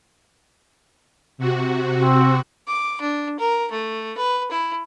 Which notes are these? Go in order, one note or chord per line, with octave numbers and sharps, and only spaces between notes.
C3 F#4
C4
D6
D4
A#4
A3
B4
E4